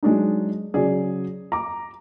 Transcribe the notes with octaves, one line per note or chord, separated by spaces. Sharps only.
F#3 G#3 D4 D#4
C#3 F#3 G#4 D5
A#5 D6